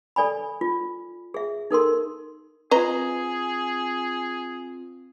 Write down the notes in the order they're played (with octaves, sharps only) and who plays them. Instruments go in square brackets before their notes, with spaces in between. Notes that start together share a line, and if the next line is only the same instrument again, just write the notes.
[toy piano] A4 D5 G#5 B5
F4
G#4 E5
D#4 A4 A#4 C6
[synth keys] C4 F4 [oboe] G#4 [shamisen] B4 D#5 A#5